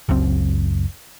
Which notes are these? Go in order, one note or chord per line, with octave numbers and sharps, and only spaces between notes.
F#1 C#2 F#2 C4